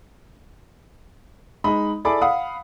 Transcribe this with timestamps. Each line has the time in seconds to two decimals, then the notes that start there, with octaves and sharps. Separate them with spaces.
1.64 G#3 D#4 B5
2.05 E4 G#4 A4 D5 B5 D6
2.21 F5 F#5 B5 D#6